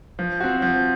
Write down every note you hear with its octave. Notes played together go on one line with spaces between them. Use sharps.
F3
C4 F#4
F3